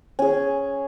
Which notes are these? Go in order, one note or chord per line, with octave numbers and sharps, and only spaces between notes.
C#4 G#4